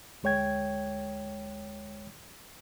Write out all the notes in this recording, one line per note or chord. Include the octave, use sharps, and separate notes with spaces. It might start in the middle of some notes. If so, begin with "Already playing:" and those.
D2 G#3 C#5 G5 G#6